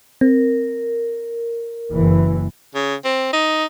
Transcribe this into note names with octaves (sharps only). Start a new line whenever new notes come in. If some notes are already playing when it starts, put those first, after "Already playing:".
C4 A#4
F#1 E3
C#3
C4
D#4